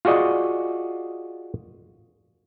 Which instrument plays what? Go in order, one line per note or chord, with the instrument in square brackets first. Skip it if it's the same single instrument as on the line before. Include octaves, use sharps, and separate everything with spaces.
[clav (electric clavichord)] F4 F#4 G#4 D5 D#5